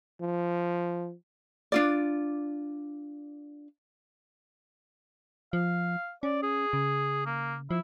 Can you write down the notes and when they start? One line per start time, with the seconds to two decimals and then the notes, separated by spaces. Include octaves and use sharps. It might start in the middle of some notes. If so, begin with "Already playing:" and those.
0.21 F3
1.72 D4 F4 D5
5.53 F3 F5
6.23 C#4 D5
6.43 G#4
6.73 C#3
7.26 A#3
7.71 F3 E4